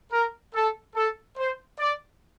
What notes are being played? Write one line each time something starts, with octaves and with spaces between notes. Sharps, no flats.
A#4
A4
A4
C5
D5